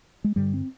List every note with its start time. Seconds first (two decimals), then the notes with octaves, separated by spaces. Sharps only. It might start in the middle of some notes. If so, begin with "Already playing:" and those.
0.24 G#3
0.36 G2 D3 G3
0.54 C4